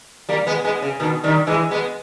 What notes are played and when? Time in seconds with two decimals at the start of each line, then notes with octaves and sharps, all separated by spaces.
0.29 G3 A#3
0.47 G#3 B3
0.64 G#3 B3
0.82 C#3
1.00 B2 D#3
1.24 D#3 G3
1.47 E3 G#3
1.71 G#3 B3